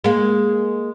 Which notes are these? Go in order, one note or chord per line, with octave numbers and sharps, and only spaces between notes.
G#3 A#3